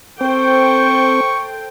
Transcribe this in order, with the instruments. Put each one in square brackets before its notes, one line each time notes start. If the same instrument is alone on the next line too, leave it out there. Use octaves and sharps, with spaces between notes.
[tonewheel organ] C4 [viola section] A4 C5 G5 [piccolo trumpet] C#6